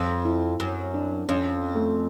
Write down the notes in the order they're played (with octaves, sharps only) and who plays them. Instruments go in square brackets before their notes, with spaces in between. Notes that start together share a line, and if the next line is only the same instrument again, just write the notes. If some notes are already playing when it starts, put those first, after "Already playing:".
Already playing: [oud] F2 [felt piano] C4
[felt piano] E4
[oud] F#2
[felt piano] D4
[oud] F2 [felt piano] C#4
[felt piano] A3